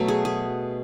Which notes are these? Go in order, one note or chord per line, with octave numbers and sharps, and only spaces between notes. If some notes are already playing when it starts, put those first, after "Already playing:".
Already playing: B2 F#3 A3
G#4
G#4